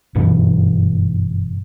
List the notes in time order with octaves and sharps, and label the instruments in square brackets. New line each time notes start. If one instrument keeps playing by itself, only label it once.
[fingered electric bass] F#1 G2 B2 E3